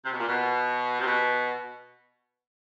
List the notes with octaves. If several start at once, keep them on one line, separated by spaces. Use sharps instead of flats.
C3
B2
A#2
B2
C3
B2